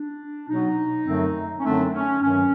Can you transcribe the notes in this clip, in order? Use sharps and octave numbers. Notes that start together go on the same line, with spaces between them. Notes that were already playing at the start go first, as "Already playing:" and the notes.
Already playing: D4
B2 F#3 B3 D#4
F#2 D3 F#3 A3 C4
C#4
F#2 D3 F#3 A3 C4 D4
C#4
G2 D#3 F#3 C#4